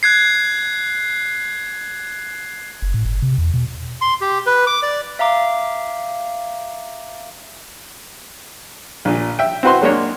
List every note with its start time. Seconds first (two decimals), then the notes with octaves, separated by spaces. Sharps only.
0.03 F#6 G#6 C7
2.82 F#1
2.94 A2
3.05 G1
3.22 C3
3.38 E2
3.54 B2
4.01 C6
4.21 G4
4.46 B4
4.67 D6
4.83 D5
5.19 E5 F5 A#5 D6
9.05 A#1 A#2
9.39 E5 G5
9.63 C4 E4 F#4 B4 C5 C6
9.81 F#3 G#3 A#3 D4 C#5